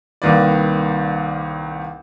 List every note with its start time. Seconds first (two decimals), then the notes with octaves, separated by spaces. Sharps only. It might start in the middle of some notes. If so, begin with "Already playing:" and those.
0.22 C2 D#3 A#3 B4 D5